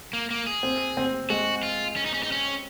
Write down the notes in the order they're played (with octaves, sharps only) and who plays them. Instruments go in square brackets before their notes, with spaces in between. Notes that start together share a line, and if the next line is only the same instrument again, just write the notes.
[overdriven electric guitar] A#3
A#3
G#4
[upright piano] C4
C4
[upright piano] G#3 [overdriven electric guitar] F#4
[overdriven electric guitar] F4
C#4
D#4
C#4
D#4
C#4